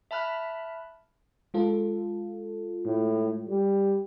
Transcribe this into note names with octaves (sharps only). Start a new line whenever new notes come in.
E5 A5 B5 F6 F#6
G#3 F4 A4
A2
G3